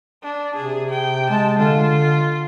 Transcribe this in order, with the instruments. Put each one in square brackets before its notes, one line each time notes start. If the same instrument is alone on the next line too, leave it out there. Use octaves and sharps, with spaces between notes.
[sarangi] D4
[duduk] C3 [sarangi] G#4
[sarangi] G5
[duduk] G#3 [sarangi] A5
[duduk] D3 [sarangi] F4